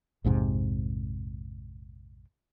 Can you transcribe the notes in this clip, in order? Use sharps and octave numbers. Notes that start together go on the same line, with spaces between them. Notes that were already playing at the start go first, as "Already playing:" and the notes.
A#1 F2 G#2 C3